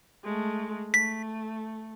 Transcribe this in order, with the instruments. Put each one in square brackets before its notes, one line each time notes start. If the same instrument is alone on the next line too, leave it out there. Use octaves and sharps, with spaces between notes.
[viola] G#3 A3
[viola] A3 [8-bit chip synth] B6